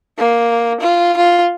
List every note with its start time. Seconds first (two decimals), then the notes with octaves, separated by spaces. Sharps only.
0.18 A#3
0.81 F4
1.17 F4